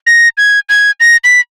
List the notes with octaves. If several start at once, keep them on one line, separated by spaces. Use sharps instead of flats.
A#6
G#6
G#6
A#6
B6